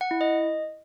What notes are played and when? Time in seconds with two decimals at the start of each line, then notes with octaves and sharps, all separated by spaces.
0.01 F#5
0.11 E4
0.21 D#5